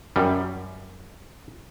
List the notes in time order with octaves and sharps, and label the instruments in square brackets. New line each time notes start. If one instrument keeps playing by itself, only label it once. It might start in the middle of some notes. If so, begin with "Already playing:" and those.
[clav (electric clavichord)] F#2 G3